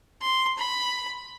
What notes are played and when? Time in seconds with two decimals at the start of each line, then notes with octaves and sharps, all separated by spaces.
0.22 C6
0.58 B5